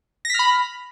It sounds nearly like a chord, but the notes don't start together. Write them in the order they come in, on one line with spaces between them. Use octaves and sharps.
A#6 B6 F6 B5